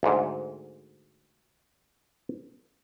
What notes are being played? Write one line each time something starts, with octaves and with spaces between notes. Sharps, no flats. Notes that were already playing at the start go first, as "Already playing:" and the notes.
D2 G#2